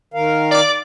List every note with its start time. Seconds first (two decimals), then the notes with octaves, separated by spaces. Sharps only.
0.14 D#3 A#4 F5
0.51 D5 D6